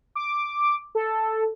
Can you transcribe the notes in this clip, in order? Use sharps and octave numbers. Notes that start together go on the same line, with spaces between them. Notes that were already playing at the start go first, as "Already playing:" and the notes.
D6
A4